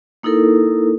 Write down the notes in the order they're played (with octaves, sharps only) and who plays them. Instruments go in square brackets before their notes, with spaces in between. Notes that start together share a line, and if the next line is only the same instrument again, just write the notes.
[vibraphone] A#3 D#4 E4 A4 A#4